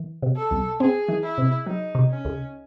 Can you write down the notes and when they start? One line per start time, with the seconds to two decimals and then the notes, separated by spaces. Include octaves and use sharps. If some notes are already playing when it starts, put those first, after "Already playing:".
Already playing: E3
0.22 C3
0.36 A4
0.51 C2
0.80 C4 G#4
1.08 E3
1.23 E4
1.38 C3
1.66 F#3 D#4
1.95 C3
2.10 C#4
2.25 C#2